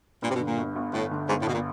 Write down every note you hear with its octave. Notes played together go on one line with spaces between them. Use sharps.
G2 A#2
C3
B2
D3
A#2
G1
G1
G1 A2
D3
G1 G#2
A2
G1 B2
A#2